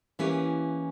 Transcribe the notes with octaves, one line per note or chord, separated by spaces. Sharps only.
E3 A#3 C#4 E4 G4 B4